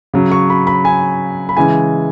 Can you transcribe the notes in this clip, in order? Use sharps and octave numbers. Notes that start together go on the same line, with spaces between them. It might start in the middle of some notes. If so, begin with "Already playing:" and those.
C#3 F#3
C#6
B5
B5
G#5
B5
C#3 E3 G#3 G#5